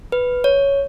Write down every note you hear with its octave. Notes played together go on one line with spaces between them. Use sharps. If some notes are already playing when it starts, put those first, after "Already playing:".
B4
C#5